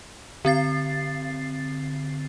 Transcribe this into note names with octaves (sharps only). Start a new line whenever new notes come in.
D3 C4 A6 C7